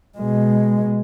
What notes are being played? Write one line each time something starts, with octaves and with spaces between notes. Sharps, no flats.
B2 G#3